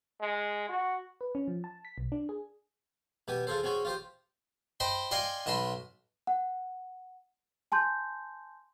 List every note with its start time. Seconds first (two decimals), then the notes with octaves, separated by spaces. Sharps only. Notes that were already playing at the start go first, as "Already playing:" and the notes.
0.21 G#3
0.69 F#4
1.21 B4
1.35 C#4
1.48 F3
1.64 A5
1.85 B6
1.98 B1
2.12 D4
2.29 G#4
3.28 B2 G4 G#5
3.47 F4 G#4 A4 C5
3.64 C4 C#4 F#4 G#4 G#5
3.85 F4 G4 C5
4.80 C5 D#5 G5 B5 C6
5.11 D5 D#5 F5 G5 G#5 C6
5.46 B1 D#5 A5 B5 C6
6.27 F#5
7.72 G#5 A5 C6 G6